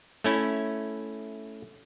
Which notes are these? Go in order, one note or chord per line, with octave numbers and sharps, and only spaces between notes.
A3 C#4 E4